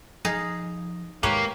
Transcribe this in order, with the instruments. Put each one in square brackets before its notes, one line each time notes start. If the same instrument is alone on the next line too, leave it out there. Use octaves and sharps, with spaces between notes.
[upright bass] F3 [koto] D#4 G#4 F5
[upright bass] G#2 D#3 [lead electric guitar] A#3 [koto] G4 B4 C#5